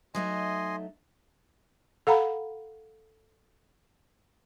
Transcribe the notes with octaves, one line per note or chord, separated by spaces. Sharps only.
F#3 A3 D#4 D#5 G#5 C6
A4 F5 F#5 A#5 B5